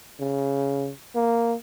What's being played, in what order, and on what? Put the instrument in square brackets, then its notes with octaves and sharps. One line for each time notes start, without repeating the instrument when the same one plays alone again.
[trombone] C#3
A#3